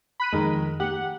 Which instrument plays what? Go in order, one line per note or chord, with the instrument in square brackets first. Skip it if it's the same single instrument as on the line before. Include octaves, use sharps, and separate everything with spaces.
[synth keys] B5 F#6 D#7
[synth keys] F2 D#3 [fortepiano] G#3 A#4
[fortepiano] G4 [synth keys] F#5